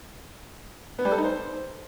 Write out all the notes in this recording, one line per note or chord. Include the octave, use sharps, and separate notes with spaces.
B3
G3
A4
D#4
C5